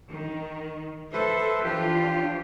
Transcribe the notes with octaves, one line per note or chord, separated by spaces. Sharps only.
D#3
A4 B4 C5 E5
E3 F3 D4 F4 G4